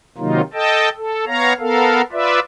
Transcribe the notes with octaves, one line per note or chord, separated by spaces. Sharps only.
C3 D#3 F#3 A#3 D#4 F4
A4 D#5 G5 A5
A4
B3 C#5 F5 A#5
B3 A4 A#4 F5
F4 B4 D5 E5